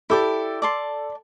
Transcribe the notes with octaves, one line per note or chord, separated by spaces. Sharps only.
E4 G4 A4 D5
D5 A5 C6